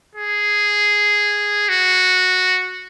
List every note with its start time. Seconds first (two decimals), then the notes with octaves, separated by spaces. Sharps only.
0.15 G#4
1.69 F#4